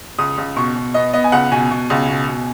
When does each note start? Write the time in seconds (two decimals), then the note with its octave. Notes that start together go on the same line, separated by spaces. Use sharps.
0.19 C#2 D#6
0.38 C#2
0.56 B2 C#6
0.76 B2
0.94 B3 D#5
1.13 B3 D#5
1.24 G#5
1.32 C#2 F#5
1.52 B2 G#5
1.71 B2
1.90 C#2
2.09 B2
2.27 B2